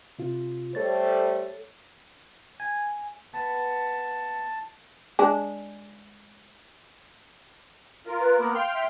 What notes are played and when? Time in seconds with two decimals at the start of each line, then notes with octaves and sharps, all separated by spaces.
0.19 C3 F4
0.75 G3 A3 A4 C5 C#5 A6
2.60 G#5
3.34 B3 A5
5.19 G#3 D4
8.07 F4 A#4
8.19 B4
8.38 A#3 B3 A#4 B5
8.54 F5 G5 C6 F6
8.73 E5